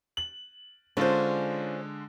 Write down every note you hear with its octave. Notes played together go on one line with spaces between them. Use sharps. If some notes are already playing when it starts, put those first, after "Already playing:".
F#7
D3 G#3 C#4 D4 F4 C5